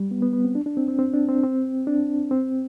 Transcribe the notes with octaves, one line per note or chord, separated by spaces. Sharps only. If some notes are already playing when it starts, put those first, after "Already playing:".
Already playing: G3
B3
B3
B3
C4
D4
D4
C4
C4
C4
D4
C4
C4
D4
C4